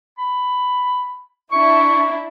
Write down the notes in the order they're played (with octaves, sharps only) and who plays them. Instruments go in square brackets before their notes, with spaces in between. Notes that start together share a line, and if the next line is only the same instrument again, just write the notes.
[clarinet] B5
[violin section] D4 E4 [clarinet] C#6